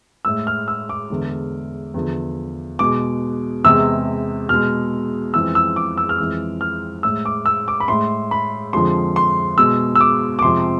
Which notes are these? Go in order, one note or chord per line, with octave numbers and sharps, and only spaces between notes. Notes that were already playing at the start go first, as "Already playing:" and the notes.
A2 G#3 E6
F6
E6
D6
E2 D3 G#3
E2 D3 F3
B2 G#3 D6
E2 C3 G#3 E6
B2 G#3 F6
F2 E3 G#3 E6
E6
D6
E6
F6
F2 E3 G#3 E6
F6
A2 G#3 E6
D6
E6
D6
B5
A2 G#3 C6
B5
F2 D3 F3 G#3 C6
C6
B2 G#3 E6
E6
D6
D6
F2 C3 F3 G#3 C6